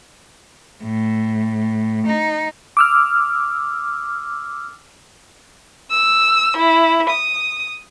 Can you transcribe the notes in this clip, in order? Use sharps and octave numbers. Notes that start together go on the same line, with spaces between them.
A2
D#4
D6 E6 F6
E6
E4
D#6